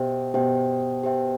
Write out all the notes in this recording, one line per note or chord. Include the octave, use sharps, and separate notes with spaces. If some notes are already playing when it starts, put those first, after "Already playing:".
Already playing: B2 G4 C5 E5 G5
B2 G4 C5 E5 G5
G4 C5 E5 G5